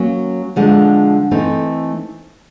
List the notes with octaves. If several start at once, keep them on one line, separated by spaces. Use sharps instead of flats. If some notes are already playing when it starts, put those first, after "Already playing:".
Already playing: F#3 A#3 C#4
D3 F3 G#3
E3 A3 C4 D#4